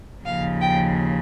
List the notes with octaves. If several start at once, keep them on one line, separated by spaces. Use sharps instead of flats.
D#2 C#3 F3 F5
G5